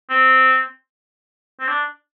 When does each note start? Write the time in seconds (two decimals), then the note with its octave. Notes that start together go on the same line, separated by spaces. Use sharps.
0.10 C4
1.60 C4
1.68 D4